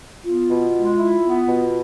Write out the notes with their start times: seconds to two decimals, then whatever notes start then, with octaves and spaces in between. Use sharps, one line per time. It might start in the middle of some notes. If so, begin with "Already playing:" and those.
0.25 B3 F4
0.50 B2
0.74 G#3
0.99 E4
1.23 B3
1.48 B2